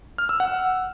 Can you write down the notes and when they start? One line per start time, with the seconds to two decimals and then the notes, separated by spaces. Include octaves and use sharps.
0.18 F6
0.29 E6
0.40 F#5